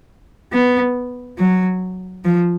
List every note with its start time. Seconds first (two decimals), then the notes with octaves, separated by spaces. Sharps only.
0.53 B3
1.39 F#3
2.25 F3